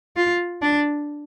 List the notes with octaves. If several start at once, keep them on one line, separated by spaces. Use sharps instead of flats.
F4
D4